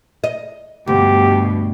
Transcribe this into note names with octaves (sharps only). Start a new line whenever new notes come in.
D#5
D2 G2 B2 G4